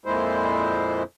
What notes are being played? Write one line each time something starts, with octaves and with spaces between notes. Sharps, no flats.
F2 A#2 G#3 E4 C5